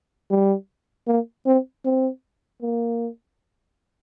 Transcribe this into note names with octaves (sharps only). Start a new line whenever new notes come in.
G3
A#3
C4
C4
A#3